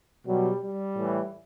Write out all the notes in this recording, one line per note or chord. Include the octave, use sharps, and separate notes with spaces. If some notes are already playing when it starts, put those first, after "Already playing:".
B2 F#3 G3
G3
A2 E3